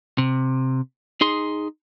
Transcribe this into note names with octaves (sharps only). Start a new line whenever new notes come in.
C3
D#4 G#4 C6